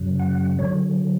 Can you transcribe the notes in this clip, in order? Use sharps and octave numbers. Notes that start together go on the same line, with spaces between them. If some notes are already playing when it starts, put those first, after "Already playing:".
Already playing: F#2 C#3 F#3
F#5
D3 F#3 C#5